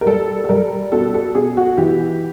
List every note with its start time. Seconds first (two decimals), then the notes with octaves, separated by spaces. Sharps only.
0.01 A#4
0.06 G3 A4
0.44 A4
0.49 G3 A#4
0.92 B2 A4
1.14 A4
1.35 B2 G#4
1.57 F#4
1.78 E3 G4